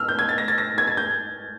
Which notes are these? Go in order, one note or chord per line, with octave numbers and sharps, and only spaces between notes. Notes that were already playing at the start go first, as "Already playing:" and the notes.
Already playing: E6 F6
G6
G#6
A6
A#6
A6
A#6
G#6
A6
G6